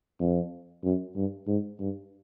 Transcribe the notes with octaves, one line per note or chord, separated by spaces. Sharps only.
F2
F#2
G2
G#2
G2